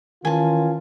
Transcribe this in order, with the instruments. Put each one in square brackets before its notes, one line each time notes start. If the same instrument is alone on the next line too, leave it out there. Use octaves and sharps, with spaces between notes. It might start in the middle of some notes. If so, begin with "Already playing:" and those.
[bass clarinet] D#3 [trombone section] E3 C#4 F4 [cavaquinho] G#5 A5